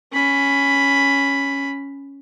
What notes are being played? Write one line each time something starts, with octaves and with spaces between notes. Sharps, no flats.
C#4 B5